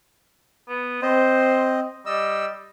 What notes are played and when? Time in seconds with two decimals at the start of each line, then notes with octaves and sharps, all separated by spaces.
0.68 B3
1.03 C4 C5 D#5
2.06 G3 D#5 E6